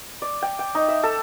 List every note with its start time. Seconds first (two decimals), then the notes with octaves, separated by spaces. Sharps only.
0.22 D5
0.42 G5
0.59 G5
0.75 D#4
0.88 E5
1.03 A4